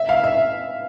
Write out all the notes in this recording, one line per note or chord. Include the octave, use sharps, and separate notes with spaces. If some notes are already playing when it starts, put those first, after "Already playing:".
Already playing: E5
F5
E5